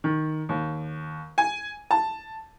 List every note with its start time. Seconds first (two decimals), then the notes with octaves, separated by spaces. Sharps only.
0.04 D#3
0.49 D#2
1.38 G#5
1.91 A5